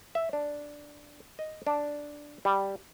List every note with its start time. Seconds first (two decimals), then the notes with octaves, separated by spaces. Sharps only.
0.15 E5
0.33 D4
1.39 D#5
1.67 D4
2.45 G3